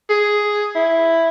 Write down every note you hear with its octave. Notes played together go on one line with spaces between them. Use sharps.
G#4
E4